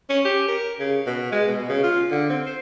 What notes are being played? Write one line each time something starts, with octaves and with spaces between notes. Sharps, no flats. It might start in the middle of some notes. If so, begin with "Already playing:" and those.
C#4
G4
A#4
C#3
B2
G#3
B2
C#3
F4
D3
C4
C5